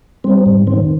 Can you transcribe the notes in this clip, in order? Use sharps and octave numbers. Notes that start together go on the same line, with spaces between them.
G3 C4 C5
G#2
D#3 C4 C5